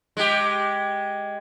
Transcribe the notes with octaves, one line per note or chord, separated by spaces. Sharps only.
G#3 G4